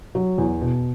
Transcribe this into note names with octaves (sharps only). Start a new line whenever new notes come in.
F#3
E2
B2